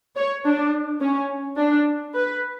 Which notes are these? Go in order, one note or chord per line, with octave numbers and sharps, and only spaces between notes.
C#5
D4
C#4
D4
B4